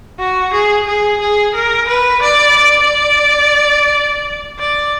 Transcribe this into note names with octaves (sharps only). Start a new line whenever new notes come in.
F#4
G#4
G#4
G#4
A#4
B4
D5
D5
D5